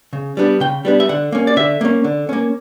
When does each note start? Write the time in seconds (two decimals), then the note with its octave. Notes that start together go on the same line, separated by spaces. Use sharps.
0.13 C#3
0.37 G3 B3 D4
0.60 C#3 G5
0.85 G3 B3 D4
1.00 E5
1.09 D3 F#5
1.32 A#3 C#4
1.47 D5
1.56 D3 E5
1.81 A#3 C#4
2.04 D3
2.29 A#3 C#4